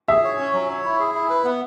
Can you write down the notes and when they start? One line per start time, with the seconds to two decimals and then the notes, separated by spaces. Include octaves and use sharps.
0.08 G#4 E5
0.24 C#5
0.39 C#4
0.54 F#3
0.69 C#5
0.85 E4
1.00 G#4
1.14 E4
1.30 B4
1.45 B3